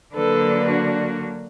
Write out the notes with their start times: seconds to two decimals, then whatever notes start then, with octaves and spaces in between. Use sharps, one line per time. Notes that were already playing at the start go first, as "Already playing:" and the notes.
0.14 D3 F#3 A#3 D4 A4 B4
0.68 F#4